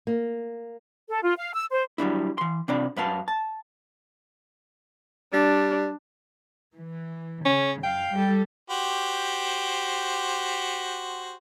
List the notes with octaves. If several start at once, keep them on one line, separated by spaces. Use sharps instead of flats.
A#3
A4
F4
F5
E6
C5
F#3 G3 D4 E4
E3 C6
C3 C4 D4 F4 D5 B5
F#2 B4 F5 A5
A5
G3 D4
E3
C#3 C#4
F#2 F5 G5
G3 A4
F#4 G4 C5